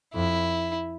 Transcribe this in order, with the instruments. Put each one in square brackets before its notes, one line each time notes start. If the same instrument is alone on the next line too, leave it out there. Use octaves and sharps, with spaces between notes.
[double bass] F2 [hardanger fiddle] E4